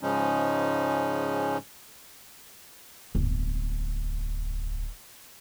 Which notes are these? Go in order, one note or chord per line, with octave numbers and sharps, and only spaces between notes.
G#2 C#3 F3 G#3 C#4 D#4
D1 G1